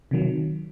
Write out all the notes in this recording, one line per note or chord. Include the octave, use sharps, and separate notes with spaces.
C3 D#3 F#3